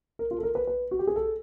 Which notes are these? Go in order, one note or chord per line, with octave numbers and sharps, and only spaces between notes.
A#4
F4
A4
A#4
B4
B4
F#4
G4
G#4
A4